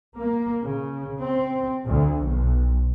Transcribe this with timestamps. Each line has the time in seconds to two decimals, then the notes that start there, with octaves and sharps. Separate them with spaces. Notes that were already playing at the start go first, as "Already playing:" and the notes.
0.17 A#3
0.62 C#3
1.18 C4
1.85 D2
2.26 B1